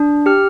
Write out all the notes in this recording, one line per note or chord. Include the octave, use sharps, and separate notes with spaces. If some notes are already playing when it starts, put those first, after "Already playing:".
Already playing: D4
G4 F6